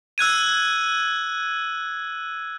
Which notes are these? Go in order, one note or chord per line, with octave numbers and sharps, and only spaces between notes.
E6 F#6 G#6 D#7